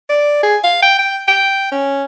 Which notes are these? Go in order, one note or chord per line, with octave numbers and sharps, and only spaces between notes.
D5
G#4
F5
G5
G5
G5
C#4